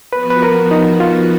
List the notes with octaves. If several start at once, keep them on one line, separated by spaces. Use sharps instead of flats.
F3 B3 F#4 B4
B4
A#4
D#4
F4